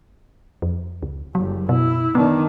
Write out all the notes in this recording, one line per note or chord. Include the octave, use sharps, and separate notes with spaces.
F2
C#2
F#1 F#3 G3
B2 E4
D#3 B3 D4